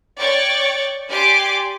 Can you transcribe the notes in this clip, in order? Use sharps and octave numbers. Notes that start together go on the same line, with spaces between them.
C#5 D5 G5 C#6 A6
G4 D5 G#5 C6 D6